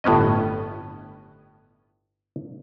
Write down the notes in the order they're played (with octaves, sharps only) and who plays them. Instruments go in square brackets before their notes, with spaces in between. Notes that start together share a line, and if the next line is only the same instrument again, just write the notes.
[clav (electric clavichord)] G1 A2 B3 C#4 D#5